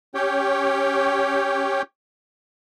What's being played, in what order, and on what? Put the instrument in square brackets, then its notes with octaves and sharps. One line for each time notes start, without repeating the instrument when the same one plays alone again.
[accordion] C#4 G4 C#5 G5